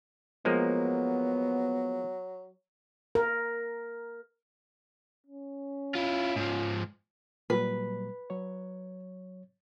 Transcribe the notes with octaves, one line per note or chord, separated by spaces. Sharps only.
F3 F#3 G#3 A#3 B3
A#4
C#4
E4 F4
G#2 F3
A#2 F#3 G3 B4
F#3 C#5